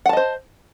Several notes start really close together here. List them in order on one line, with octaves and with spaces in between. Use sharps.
F#5 A5 D#5 C5